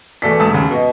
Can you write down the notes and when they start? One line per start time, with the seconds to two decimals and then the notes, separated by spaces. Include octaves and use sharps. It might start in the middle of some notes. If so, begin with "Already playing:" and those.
0.22 E2 B2 A3 A4 D5 B6
0.40 E1 A3 A5 D#6
0.51 D#2 C#3
0.71 B2 D#5